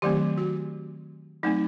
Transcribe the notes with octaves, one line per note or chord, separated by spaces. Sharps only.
D#3 F#3 A3 C4 G4
F#4
F#3 A3 C4 D#4